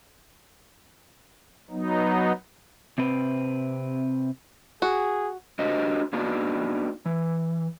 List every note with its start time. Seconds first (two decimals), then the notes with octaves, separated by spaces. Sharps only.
1.70 F#3 B3 D#4
2.98 C3 C4 B4
4.82 F#4 G#4
5.59 D4 F#4 G4 A#4 C5 D#5
6.13 A#3 B3 D4 D#4 F#4
7.06 E3